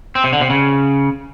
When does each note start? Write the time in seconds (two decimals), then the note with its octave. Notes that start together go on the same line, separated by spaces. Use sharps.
0.15 C4
0.24 C3
0.33 D3
0.41 C3
0.50 C#3